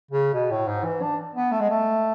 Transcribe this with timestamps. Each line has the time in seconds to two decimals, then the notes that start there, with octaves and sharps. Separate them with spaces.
0.11 C#3
0.33 B2
0.51 A2
0.68 G#2
0.84 E3
1.01 D4
1.34 B3
1.51 A3
1.60 G#3
1.70 A3